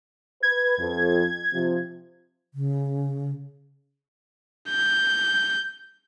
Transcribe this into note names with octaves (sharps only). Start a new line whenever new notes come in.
B4 G#6
F2
C3 F3
C#3
G6